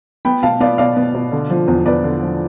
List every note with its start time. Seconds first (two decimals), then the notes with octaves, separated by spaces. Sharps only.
0.25 B3 G5 B5
0.43 B2 F5 A5
0.60 B3 D5 F5
0.78 B2 D5 F5
0.96 B3
1.15 B2
1.32 D3
1.50 F3
1.68 E2
1.86 E2 B4 D5
2.04 D3
2.22 F3